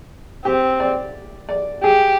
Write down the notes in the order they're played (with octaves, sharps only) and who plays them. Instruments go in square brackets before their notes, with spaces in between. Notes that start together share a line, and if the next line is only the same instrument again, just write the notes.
[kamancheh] C4 [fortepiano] G4
[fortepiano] D5
D5
[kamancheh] G4 [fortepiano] G#4